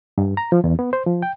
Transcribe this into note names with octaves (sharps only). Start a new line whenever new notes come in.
G2
A#5
F3
E2
B3
C5
F3
G5